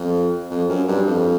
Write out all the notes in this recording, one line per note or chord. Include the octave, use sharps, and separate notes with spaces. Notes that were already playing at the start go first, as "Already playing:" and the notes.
Already playing: F2
F2
F#2
G2
F2